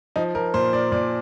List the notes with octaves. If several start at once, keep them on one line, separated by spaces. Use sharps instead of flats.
F3 D#4
F3 A#4
A#2 C5
A#2 D5
A#2 D5